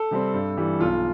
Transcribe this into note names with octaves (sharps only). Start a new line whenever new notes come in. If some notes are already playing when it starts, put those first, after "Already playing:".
Already playing: A4
C3 G3 C4
G2
E3 G3
B1 F4